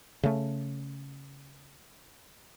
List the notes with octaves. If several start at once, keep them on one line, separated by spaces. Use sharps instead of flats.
C#3 A3